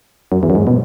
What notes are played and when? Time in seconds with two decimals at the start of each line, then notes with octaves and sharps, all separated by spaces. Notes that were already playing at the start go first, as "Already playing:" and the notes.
0.32 F#2
0.43 E2
0.50 F#2
0.55 G#2
0.67 B2